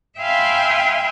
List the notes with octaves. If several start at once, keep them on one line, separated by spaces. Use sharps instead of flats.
E5 F5 G5 G#5 B5 C6